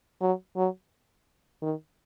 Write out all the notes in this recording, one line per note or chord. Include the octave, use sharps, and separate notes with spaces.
F#3
F#3
D#3